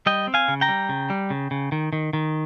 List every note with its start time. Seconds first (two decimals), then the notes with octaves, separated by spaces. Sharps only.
0.06 G3 D#5 G5
0.27 C4
0.34 F5 G#5
0.48 C#3
0.61 G5 A#5
0.69 G3
0.89 C#3
1.10 G3
1.30 C#3
1.51 C#3
1.72 D#3
1.93 D#3
2.13 D#3